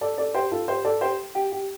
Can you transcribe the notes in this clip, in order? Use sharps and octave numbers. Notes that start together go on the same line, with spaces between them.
A4 D5
A4 D5
G4 C5
F4 A4
G4 C5
A4 D5
G4 C5
G4
G4